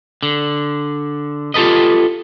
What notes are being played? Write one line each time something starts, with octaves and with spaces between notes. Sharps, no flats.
D3
F4 G4 A4 B4 D#5